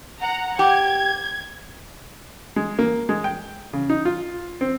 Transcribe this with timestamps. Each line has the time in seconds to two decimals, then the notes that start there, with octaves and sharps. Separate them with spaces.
0.21 F#5 A#5
0.59 G4 G#6
2.56 G#3
2.79 A#3
3.09 G#3
3.24 G5
3.73 C#3
3.90 D#4
4.05 F4
4.61 C4